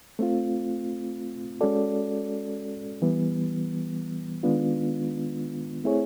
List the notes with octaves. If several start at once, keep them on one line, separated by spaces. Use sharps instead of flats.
A3 C4 F4
G#3 C#4 F#4 A4 D5
E3 G3 B3
D#3 G#3 B3 D4 F4
A3 C4 E4 G#4 C#5